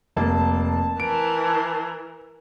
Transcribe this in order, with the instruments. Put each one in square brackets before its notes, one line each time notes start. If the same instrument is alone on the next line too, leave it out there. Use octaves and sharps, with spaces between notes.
[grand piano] F1 A#3 [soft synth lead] A5
[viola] E3 A#4 [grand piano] D7